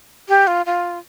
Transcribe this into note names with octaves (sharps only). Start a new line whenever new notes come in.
G4
F4
F4